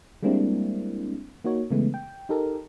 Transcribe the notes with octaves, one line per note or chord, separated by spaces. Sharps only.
G3 G#3 A#3 C4 D4 E4
A#3 D#4 F#4 C#5
C#3 E3 G#3 A3 B3
G5
D#4 G4 A4 A#4